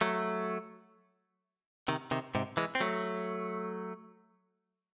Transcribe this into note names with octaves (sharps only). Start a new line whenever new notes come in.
F#3 A3
C3 D#3
C3 D#3
G#2 C3
E3 G#3
C4
F#3 A3